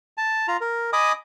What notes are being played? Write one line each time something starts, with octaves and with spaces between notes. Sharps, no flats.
A5
F4 A#5
A#4
D#5 G#5 B5 D6 D#6